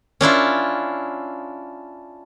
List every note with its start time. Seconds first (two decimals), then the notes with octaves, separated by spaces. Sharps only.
0.21 C#4 D4 E4 F4